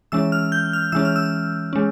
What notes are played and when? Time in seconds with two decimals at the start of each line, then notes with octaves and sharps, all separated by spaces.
0.12 E3 G#3 C#4 E6
0.32 F6
0.52 G6
0.73 F6
0.92 E3 G#3 C#4 E6
1.05 F6
1.16 E6
1.73 G#3 C#4